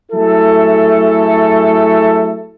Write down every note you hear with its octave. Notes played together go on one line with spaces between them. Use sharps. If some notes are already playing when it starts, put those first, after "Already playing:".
F#3 A3 E4 G#4 A4